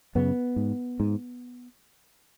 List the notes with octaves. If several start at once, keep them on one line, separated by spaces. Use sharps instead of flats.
F#2 C#3 B3
G#2
G#2